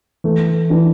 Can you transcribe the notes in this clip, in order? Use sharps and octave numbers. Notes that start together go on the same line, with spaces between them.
E3 A3
E3 D4